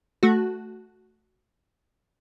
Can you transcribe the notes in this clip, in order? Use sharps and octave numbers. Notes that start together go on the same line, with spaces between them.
A3 F#4